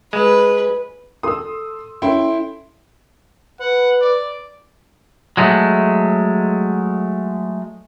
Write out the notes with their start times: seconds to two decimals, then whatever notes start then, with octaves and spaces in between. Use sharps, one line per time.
0.13 G#3 B4
1.23 A4 C6 D#6 E6
2.02 C#4 E4 A4 G5 C6
3.60 B4 F#5
4.01 D5
5.37 F#3 G#3 A3